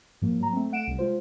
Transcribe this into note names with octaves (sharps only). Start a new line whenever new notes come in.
G#2 F3 A#3
F#3 A#5
A3 C4
A3 F#5 D7 E7
C2
G#3 F4 C5